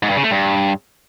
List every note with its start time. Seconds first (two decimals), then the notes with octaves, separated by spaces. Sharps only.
0.03 G#2
0.10 G2
0.17 C#3
0.24 A3
0.31 G2